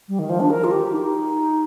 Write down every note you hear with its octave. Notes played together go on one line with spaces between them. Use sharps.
G3
D#3
F3
D4
A#4
F4
G4
D#4